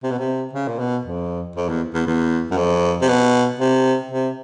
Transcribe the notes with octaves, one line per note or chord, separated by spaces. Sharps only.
C3
B2
C3
C#3
A#2
B2
F2
F2
E2
E2
E2
F#2
F2
C3
B2
C3
C3